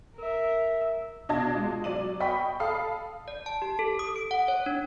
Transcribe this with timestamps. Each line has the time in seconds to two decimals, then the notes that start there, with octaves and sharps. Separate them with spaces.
0.16 A#4 E5
1.29 B2 D4 D#5 A5 G#6 A#6
1.55 G#3 F4
1.84 F#3 D5 D#7 F#7
2.20 D#5 G5 B5 C#6 B6
2.60 A4 F5 B5 D#6
3.28 D5
3.46 A5
3.62 G4
3.79 A4
3.99 D#6
4.16 D7
4.31 F#5
4.48 C#5
4.66 D4